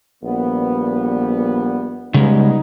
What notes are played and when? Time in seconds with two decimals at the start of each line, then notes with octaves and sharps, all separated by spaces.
0.23 A#1 G3 B3
2.14 C#3 G3 G#3 B3 D#4